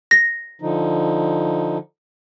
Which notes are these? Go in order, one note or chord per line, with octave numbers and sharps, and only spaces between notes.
A#6
D3 F3 D#4